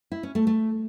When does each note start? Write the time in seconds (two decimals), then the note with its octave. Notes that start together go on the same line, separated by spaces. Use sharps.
0.12 E4
0.23 C#4
0.35 A3
0.47 A3